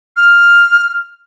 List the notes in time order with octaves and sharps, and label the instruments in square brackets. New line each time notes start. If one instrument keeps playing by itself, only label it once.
[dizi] F6